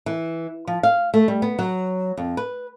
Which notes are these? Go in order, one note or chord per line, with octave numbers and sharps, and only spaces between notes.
E3
F3
F5
A3
G3
B3
F#3
F2
B4